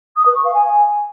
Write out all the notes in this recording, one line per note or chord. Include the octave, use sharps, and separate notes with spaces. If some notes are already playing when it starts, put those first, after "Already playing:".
D#6
B4
C#6
F5
G#5